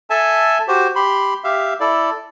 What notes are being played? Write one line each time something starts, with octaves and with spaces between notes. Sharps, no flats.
A4 E5 G#5 A5
F#4 G4 C5
G4 B5 C6
G4 E5 F5
E4 A4 D5